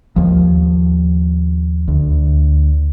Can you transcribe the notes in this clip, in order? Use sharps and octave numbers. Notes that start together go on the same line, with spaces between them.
D#2 F3
D2